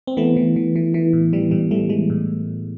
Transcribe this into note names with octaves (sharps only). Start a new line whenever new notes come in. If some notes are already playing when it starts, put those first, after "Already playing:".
C4
E3 A3 B3
E3
E3
E3
E3
A2
E3 G3
A2 G3
E3 G3 A3
E3 G#3
A2